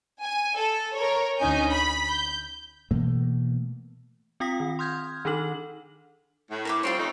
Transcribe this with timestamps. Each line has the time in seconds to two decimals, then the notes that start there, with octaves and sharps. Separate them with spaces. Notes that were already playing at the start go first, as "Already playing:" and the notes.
0.22 G#5
0.57 A4
0.95 A#4 C#5
1.39 D2 C#4 D#4 G#5 G6
1.70 B5
2.09 G6
2.91 B2 E3 A3 A#3
4.40 C4 F4 G5 D#6 A#6 B6
4.60 D#3
4.79 C6 D#6 F6 G6 G#6
5.25 D#3 D4 D#4 A4 F#7
6.50 A2
6.65 A#4 E5 D6
6.83 G3 C4 F4 F#4 C#5
6.97 F2 A3 D#4